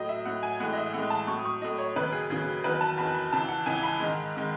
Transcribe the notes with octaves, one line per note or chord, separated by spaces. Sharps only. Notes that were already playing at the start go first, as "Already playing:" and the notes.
Already playing: A2 F#3 D#5
E5
A2 F#3 F#5
G#5
A2 E3 G#3 F#5
D#5
E5
A2 E3 G#3 F#5
A5
A2 F#3 C#6
D#6
C#6
A2 F#3 D#5
C#5
D#2 C#3 F#3 B4
G#4
D#2 C#3 F#3 G#4
E2 D#3 F#3 B4
A5
E2 D#3 F#3 B5
B5
C#2 C#3 E3 A5
F#5
C#2 C#3 E3 G#5
B5
G#2 D#3 G#3
D#3 G#3